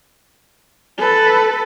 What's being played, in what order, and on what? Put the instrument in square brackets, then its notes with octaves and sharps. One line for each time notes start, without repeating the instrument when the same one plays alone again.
[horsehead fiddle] A4 B4